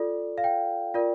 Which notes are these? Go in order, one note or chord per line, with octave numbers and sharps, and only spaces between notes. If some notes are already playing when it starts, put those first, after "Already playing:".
Already playing: F4 A4 D5
F5
G5
F4 A#4 D5